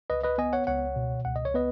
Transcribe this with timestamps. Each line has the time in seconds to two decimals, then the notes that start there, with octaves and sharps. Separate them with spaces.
0.10 C#2 B4 D#5
0.23 B4 D#5
0.38 B3 D#5 G#5
0.53 C#5 F#5
0.67 C#2 C#5 F#5
0.96 B2
1.25 C#2 F#5
1.36 D#5
1.45 C#5
1.54 B3 B4 D#5